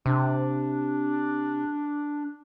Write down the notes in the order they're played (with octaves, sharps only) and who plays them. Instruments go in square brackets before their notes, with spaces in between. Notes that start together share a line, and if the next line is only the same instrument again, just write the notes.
[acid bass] C3 [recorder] D4